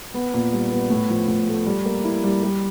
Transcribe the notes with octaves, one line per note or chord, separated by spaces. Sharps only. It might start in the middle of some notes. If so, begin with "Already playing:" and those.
B3
A#2
G3
B3
A2
F3
A2
A3
G3
A#3
E4
G3
G3